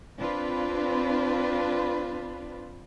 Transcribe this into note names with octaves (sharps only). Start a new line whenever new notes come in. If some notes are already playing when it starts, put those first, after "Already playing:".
C4 D4 F4 B4